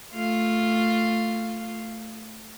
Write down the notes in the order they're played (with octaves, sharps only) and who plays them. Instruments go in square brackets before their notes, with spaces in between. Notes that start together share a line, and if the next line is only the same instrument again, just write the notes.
[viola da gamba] A3 F4